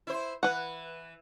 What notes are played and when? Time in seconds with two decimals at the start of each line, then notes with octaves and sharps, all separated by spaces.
0.07 E4 C5
0.43 E3 B4 F#5